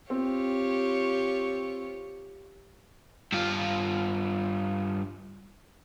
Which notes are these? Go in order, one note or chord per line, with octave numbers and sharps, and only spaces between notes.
C4 F4 G4 C#5
G2 F4